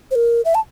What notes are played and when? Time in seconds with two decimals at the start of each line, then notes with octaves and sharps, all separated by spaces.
0.11 C5
0.15 A#4
0.45 E5
0.55 A5